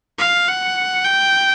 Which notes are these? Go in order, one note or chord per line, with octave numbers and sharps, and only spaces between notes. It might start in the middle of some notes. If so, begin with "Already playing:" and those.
F5
F#5
G5